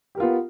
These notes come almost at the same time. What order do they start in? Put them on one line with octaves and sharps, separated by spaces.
G4 A#4 F4 B3